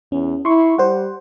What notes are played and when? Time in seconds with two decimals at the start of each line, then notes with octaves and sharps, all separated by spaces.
0.12 E2 C#4
0.45 E4 C6 C#6
0.78 G3 C5 F#5